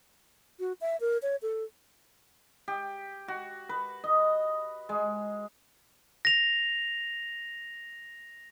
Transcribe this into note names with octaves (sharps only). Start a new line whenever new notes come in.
F#4
E5
A#4
C#5
A4
G4
F#4
B4
D#5
G#3
A#6 F7